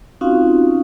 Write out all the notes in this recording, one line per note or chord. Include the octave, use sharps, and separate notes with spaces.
C4 C#4 D#4 F4 F#4 F5